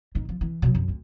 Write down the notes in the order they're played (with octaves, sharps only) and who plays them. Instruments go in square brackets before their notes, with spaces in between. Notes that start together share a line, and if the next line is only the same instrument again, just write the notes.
[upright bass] A2 D#3
F3
E3
B2 F#3
F#2 D3
D2